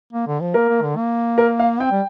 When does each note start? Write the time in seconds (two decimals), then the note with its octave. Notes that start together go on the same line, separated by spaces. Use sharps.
0.13 A#3
0.27 D3
0.40 F3
0.54 A#3 A#4
0.68 A#3
0.82 D3
0.97 A#3
1.38 A#4
1.59 F5
1.80 C4 G5
1.91 G3